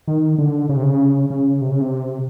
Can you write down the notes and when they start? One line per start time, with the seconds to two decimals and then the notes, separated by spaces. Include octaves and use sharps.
0.07 D#3
0.38 D3
0.69 C#3
0.76 C3
0.83 C#3
1.30 C#3
1.61 C3
1.71 C#3
1.81 C3